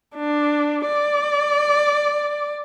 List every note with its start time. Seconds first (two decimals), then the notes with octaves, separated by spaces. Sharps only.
0.16 D4
0.87 D5